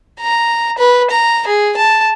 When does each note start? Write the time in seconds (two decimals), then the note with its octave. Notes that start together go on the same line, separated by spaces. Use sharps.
0.20 A#5
0.78 B4
1.10 A#5
1.48 G#4
1.77 A5